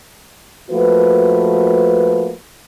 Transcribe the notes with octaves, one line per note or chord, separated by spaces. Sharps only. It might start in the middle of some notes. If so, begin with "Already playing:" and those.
F3 A3 A#3 F#4 B4